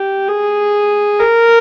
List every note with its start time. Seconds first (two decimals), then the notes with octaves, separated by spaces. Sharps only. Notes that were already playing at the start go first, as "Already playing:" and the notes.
Already playing: G4
0.28 G#4
1.19 A#4